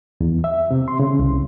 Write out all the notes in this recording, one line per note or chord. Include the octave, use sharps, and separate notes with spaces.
E2
E5
C3
C6
C#3
C2